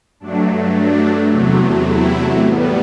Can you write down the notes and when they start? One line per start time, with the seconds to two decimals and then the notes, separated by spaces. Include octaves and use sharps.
0.20 G2 F#3 A3 D4
0.75 D4
1.30 E2 C3 F#3 A3
1.86 E4
2.42 A2 G3 B3